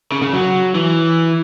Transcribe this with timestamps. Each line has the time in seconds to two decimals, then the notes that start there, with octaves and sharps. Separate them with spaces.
0.12 C#3
0.22 C#3
0.33 F#3
0.75 E3